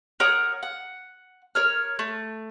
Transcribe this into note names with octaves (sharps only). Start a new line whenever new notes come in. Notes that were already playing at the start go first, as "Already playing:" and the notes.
A#4 C#5 F#5 D#6
F#5
A#4 C#5 F6
A3